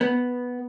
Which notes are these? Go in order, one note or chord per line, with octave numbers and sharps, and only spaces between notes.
B3